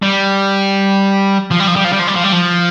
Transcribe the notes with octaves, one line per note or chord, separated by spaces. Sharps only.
G3
F3
G3
F3
G3
F3
G3
F3
G3
F3
G3
F3